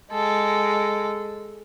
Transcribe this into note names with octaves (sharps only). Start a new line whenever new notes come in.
G#3 A4